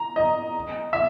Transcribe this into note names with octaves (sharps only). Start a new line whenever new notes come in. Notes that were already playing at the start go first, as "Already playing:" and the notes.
Already playing: A#5
D#5
E5